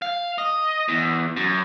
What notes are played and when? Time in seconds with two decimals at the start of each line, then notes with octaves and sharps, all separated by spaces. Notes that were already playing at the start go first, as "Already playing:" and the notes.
0.02 F5
0.38 D#5
0.89 E2
1.36 F#2